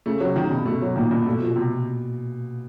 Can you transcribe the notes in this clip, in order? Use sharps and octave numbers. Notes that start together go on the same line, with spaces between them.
C#3 A3
F#3
C3
D#3
B2
G2
B2 A3
F#3
A#2 D#3
G2
B2 A3
F3
B2
C3